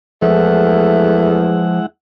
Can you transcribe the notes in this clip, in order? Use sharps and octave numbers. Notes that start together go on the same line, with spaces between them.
E2 F3 G#3 A3 E4 F#5